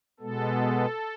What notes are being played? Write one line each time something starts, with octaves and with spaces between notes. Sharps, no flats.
B2 G#3 B3 A4